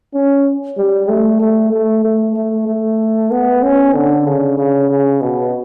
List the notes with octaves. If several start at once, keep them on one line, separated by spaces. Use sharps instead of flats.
C#4
G3
A3
A3
A3
A3
A3
A3
B3
C#4
D3
C#3
C#3
C#3
B2